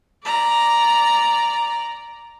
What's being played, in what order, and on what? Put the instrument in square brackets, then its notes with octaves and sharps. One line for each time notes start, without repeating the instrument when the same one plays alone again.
[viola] D5 A#5